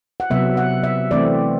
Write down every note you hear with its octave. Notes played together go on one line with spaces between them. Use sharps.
F#5
C3 F#3 B3 E5
F#5
E5
E3 A3 C4 D5